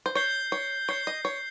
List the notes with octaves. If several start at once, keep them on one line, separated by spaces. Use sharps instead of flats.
C5
C#5 G6 C7 G7
C#5
C#5 G6 C7 G7
D#5
C#5